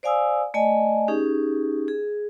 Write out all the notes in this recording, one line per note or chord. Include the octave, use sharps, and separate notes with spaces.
C5 D5 F5 G#5 D#6 E6
A3 D5 D#5 G#5
C#4 D#4 G4 G#4
G#4